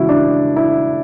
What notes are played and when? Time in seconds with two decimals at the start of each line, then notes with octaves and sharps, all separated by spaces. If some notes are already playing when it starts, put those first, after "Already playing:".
Already playing: C#3 E3 G#3 E4 F#4
0.09 D4
0.56 E4